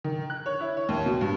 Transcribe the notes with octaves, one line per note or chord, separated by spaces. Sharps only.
D#3
F#6
C#5
E4
C#5
D#2
B2
G2